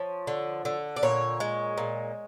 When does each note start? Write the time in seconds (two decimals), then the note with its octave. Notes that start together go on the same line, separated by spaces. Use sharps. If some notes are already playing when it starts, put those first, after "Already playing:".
Already playing: F3 C#5
0.27 D3
0.65 D3
0.96 D5
1.03 A#2 C#5
1.40 G#3
1.78 A#2